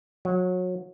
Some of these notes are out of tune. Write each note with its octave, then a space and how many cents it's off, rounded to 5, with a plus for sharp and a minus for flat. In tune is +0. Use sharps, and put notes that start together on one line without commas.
F#3 -25